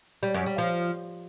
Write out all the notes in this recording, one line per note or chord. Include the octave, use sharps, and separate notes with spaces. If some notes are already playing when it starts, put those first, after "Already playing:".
G3
F#2
G3
F3